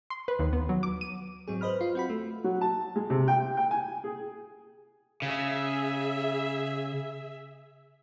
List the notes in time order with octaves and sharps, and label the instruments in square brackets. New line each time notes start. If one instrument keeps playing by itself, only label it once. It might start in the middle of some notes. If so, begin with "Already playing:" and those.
[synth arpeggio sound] C6
B4
D#2
B3
F#3
D6
D#7
[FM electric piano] G#2 F#3 C4 G#4
B4 C5 D#5 B5 F6
F4
C4 F#4 B5
A3
[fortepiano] F#3
A5
G#3
C3
G5
G5
G#5
G#4
[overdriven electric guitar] C#3 [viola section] G#4 E5